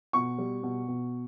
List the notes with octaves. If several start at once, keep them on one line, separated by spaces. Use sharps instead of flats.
B2 C#6
G3
B2
B2